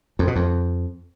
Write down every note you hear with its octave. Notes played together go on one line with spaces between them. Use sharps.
F2
B2
F2